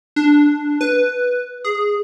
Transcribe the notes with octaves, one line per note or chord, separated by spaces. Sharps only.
D4
B4
G#4